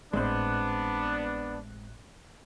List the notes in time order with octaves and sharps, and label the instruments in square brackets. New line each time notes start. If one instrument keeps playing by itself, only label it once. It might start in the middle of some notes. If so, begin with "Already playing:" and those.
[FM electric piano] G#1 A2 F#6 [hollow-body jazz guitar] G#3 C4 C5 [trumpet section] B3 D4